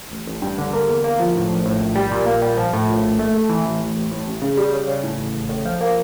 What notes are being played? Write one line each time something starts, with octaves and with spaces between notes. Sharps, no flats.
A1
A1
G2
D3
A#3
E2
A#3
F3
A2
A#1
A2
A#1
G3
A#2
A#3
G3
F3
A2
A#1
A#1
A3
A3
E3
A1
A1
A1
A2
A1
C#3
G3
C#3
C#3
A2
A1
A1
A2
F3
A#3